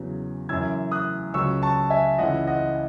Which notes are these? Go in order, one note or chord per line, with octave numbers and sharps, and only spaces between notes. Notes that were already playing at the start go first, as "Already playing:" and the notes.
Already playing: E2 C#3 F#3
F#2 C#3 E3 E6 G#6
D#6 F#6
C#2 C#3 F#3 C#6 E6
A5 C#6
E5 G#5
C#2 C#3 E3 D#5 F#5
D#5 F#5